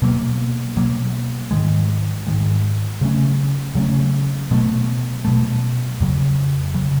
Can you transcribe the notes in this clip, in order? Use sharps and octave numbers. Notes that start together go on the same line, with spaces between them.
B2 F#3 A#3
B2 F#3 A#3
G#2 D#3 G#3
G#2 D#3 G#3
C#3 F#3 A3 C#4
C#3 F#3 A3 C#4
B2 F#3 A3
B2 F#3 A3
F2 C#3 F#3
C#3 F#3